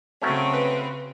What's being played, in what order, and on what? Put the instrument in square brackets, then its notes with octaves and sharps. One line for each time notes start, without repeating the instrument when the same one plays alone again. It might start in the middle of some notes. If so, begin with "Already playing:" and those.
[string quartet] C#3 C4 [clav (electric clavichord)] F#3 A3 C#4
[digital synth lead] B4